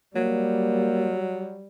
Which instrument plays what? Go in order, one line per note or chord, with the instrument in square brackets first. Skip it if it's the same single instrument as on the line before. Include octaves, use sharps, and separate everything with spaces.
[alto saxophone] F#3 [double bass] G3 [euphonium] A#3